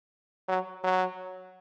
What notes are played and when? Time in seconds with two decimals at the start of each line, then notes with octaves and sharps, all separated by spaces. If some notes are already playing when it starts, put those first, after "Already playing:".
0.48 F#3
0.84 F#3